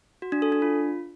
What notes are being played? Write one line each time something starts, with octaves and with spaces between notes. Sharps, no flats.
F#4
D4
A4
D4
F4